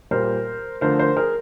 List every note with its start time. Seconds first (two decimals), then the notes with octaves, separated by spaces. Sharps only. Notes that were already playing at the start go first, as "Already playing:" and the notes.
0.11 A#2 G3 A#3 A#4 C5
0.81 D3 F3 A3 A#4 C5
0.99 A#4 C5
1.17 G#4 A#4